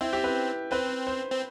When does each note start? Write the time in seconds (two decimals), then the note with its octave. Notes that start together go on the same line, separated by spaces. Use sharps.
0.01 C4 E4
0.13 G4
0.24 B4
0.72 C4 B4
1.07 C5
1.31 C4